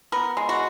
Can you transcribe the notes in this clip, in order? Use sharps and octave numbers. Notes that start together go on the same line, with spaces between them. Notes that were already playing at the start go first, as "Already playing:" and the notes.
B3 A#4
G#3
F#4